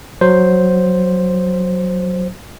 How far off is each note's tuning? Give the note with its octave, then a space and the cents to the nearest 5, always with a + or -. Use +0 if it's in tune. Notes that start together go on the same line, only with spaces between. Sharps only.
F#3 -5 C5 +0